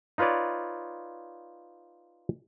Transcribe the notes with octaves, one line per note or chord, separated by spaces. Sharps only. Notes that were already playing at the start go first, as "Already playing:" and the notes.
D#4 F4 B4 C#5 D5